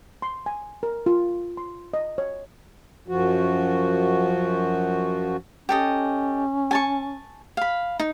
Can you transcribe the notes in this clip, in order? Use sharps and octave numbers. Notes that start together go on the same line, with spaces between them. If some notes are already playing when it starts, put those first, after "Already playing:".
C6
G#5
A#4
F4
C6
D#5
C#5
F#2 F3 F#4
C#4 G4 A4 D#5
G#5 A5 C#6
F5 B5
D#4